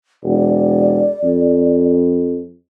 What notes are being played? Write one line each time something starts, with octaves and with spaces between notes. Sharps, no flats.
E1 D5
F2